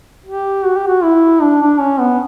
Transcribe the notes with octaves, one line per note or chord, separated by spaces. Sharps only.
G4
F#4
G4
F#4
E4
D4
D4
C#4
B3